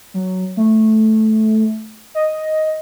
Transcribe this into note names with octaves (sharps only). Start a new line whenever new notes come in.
F#3
A3
D#5